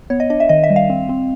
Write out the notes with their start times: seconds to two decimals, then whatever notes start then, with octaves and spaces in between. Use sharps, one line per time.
0.10 B3 C#5
0.20 D#5
0.30 D4 D#5
0.40 E5
0.49 D#3 D#5
0.64 E5
0.70 G3
0.76 F5
0.90 C4
1.09 C4